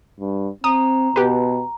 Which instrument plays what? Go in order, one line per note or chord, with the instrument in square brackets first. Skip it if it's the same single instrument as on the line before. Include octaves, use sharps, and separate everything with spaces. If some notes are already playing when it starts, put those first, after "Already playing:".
[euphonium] G2
[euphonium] C4 [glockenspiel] A#5 [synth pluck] D#6
[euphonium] B2 [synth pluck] G4 B4